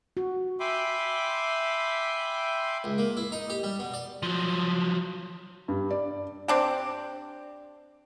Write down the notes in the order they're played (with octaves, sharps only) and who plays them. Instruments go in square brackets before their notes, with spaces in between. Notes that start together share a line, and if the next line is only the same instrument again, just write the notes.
[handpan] F#4
[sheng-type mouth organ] E5 G5 G#5 B5 C6 D6
[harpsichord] C#2
A#3
E4
D#4
G4
G3
B2
D5
[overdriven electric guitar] F3 F#3
[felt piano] G2
D5
[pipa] C4 D4 G4